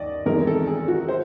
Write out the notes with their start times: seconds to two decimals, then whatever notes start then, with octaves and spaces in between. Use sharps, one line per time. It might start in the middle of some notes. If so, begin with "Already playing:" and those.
Already playing: D#2 D5 D#5
0.26 E2 C3 D#3 G#3 A#4
0.47 A4
0.67 G#4
0.88 F#4
1.08 C5